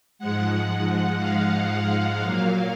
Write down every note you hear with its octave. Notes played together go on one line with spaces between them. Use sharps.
G#2 F3 G#3 F#5
F#5
F5
A#2 F#3 A#3